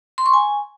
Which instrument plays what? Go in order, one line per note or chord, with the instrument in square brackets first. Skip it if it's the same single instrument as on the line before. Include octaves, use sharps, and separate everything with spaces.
[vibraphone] C6
C#6
G#5